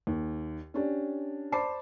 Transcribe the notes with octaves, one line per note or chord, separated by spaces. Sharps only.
D#2
C#4 D4 G4
C5 D5 A5 B5 D6 C7